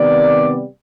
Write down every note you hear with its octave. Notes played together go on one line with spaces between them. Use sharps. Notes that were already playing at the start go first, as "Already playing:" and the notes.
Already playing: C3 D#3 G3 B3 D5